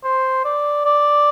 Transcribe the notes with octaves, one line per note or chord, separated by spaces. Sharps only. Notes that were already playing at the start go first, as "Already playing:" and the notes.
C5
D5
D5